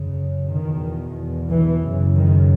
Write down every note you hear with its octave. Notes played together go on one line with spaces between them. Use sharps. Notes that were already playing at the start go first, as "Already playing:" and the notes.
Already playing: F#2 C#3
E2 B2 D#3
E3
F#2 C#3
D#3